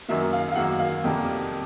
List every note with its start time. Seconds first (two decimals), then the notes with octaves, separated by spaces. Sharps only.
0.09 F#2 D#3 F#3 A#3 E5
0.33 F5
0.52 F5
0.55 F#2 D#3 F#3 A#3 F#5
0.79 F5
1.04 F2 C3 D#3 G3 A#3 G5